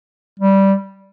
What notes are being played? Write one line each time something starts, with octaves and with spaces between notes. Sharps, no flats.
G3